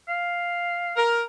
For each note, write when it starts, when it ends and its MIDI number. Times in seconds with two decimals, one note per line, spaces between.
0.08 1.01 77
0.96 1.22 70